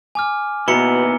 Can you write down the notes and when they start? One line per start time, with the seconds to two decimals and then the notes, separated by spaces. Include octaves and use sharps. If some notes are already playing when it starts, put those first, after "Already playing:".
0.15 G#5 D6 F6
0.68 D#2 B2 B3 E4 A#5 C#7 G7